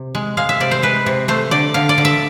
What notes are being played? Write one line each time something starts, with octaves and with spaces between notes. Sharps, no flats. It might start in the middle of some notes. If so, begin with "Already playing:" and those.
Already playing: C3
G#3
G#3 F5
E5
C3 D5
C5
G#3 B4
C3
A3 C5
D3 D5
D3 F5
D5
D3
E5